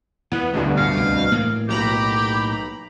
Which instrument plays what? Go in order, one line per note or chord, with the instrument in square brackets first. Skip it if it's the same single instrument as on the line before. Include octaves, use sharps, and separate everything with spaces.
[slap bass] E2 E3 [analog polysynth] B3
[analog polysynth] D2 G2 B2
[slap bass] A2 [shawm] F5
[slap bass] C2 C3
A2 E3 A#3
[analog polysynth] B1 A#5 B5 [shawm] G4